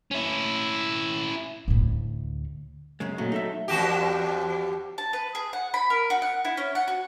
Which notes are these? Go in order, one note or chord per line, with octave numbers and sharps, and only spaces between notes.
C#4 E4
D2 A2
F#2 C#3 G#3
A#2 C#3 F#3 A3
D#4 A4 E5
E2 F#4 G4
A5
B4
G#4
F#5
B5
A#4
F#4
F#5
E4
C#4
F#5
F#4